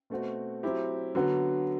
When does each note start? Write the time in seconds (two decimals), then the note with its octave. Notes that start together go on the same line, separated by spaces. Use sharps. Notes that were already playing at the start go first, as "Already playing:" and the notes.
0.10 B2 A3 C4 F#4
0.63 F#3 C4 E4 G4
1.15 D3 F#3 B3 F#4